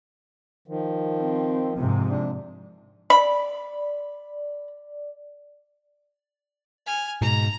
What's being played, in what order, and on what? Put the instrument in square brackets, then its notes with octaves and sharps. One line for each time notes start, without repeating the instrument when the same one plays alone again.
[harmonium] D#3 F3
[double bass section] C4
G#2 C3 F3
[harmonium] D4
[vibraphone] D5 [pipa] B5
[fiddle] G#5 F6
[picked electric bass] G#2 [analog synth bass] B2 [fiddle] A#5